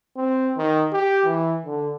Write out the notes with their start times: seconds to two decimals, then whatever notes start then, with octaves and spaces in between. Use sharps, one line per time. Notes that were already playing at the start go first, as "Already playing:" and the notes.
0.17 C4
0.57 D#3
0.93 G4
1.26 E3
1.66 D3